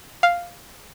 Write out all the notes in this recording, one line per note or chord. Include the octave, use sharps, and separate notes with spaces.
F5